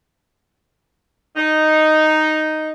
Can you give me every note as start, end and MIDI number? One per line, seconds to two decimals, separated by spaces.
1.36 2.72 63